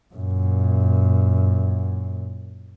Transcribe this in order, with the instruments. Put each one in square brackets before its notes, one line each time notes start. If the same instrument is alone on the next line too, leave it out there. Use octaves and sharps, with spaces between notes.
[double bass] F#2 A#2